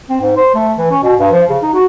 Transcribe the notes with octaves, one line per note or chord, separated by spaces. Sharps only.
C4
G#2
C5
A3
E3
C#4
B2
G2
F3
C#3
D#4
F#4